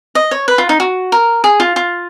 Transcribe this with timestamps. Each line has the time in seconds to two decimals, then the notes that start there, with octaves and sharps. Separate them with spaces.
0.15 D#5
0.31 C#5
0.48 B4
0.58 F4
0.69 D#4
0.80 F#4
1.12 A#4
1.44 G#4
1.60 F4
1.76 F4